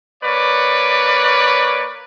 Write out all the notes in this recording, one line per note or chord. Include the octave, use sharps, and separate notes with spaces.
A#3 B4 C#5 D5